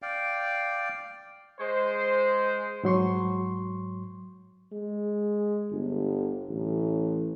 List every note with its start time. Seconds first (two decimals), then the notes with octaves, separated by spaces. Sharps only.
0.02 D5 F5 G5
1.59 G#3 C5
2.83 G#2 F#3 C6 C#6
4.73 G#3
5.71 G1
6.50 A1